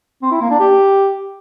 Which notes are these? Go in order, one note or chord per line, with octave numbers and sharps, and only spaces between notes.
C4
E4
A#3
D4
G4